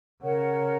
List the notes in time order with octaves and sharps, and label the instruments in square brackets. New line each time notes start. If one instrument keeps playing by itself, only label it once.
[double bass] C#3 [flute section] A#4 C#5 F#5